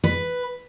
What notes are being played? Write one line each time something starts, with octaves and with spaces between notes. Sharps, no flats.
B4